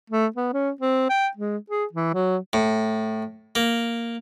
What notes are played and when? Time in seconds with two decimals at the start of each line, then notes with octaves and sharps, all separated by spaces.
0.10 A3
0.36 B3
0.53 C#4
0.80 C4
1.09 G5
1.37 G#3
1.70 G#4
1.93 E3
2.14 F#3
2.53 A2
3.55 A#3